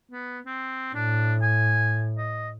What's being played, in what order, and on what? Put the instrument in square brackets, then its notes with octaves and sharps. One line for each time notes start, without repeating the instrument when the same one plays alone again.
[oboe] B3
C4
[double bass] A2 [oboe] D4
[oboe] G#5
D#5